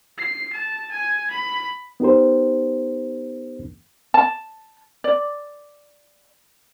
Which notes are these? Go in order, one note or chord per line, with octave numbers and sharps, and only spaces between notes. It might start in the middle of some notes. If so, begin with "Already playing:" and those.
C7
A5
G#5
B5
B3 D#4 G4 A#4 C5
A5
D5